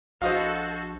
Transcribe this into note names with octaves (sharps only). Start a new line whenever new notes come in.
A#1 F#4 A4 C5 D#5 F5